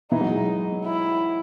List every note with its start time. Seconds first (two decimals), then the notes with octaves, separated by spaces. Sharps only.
0.11 E3 D#4
0.21 F#3
0.30 G#3
0.85 E4